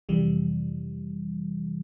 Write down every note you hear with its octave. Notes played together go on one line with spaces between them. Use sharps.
F2 C3 E3 G3